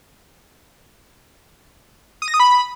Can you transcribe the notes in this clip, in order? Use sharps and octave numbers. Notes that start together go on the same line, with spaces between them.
D#6
A#6
D#6
B5